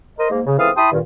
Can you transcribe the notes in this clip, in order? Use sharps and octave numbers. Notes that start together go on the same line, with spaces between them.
A#4 C5 D#5
G#2 A#3
C#3
C#2 E3 C4 A4 F5 D#6
E4 G5 A5 B5 C6 D#6
G2 A#2 D#3